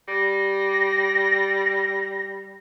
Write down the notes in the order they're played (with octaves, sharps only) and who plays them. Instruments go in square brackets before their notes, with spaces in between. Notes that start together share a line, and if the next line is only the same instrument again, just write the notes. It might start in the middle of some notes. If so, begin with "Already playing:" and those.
[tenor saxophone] G3 [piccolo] A#6